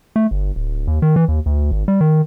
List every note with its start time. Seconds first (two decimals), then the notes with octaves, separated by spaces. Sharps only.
0.16 A3
0.31 G1
0.56 D1
0.87 D#2
1.02 D#3
1.16 E3
1.28 D#2
1.46 D2
1.72 G#1
1.88 G3
2.01 D#3